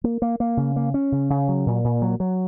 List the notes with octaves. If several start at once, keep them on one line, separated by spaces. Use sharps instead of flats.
A#3
A#3
A#3
C#3
A#3
C#4
C#3
C#3
F#3
A#2
A#2
F#3
F#3